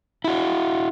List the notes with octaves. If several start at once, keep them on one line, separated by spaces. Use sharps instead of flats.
E4 F#4